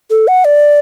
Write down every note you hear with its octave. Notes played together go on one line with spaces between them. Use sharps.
A4
F#5
D5